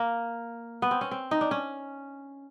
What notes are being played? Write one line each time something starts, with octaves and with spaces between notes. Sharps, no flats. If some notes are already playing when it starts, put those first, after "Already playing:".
Already playing: A#3
B3
C4
C#4
C4
D#4
D4
C#4